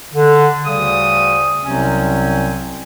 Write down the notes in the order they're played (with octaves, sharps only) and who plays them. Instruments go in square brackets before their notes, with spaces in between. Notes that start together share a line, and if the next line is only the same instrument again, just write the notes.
[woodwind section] D3
D2 C#3 G3 D#6
C2 C3 F#3 C4 C#4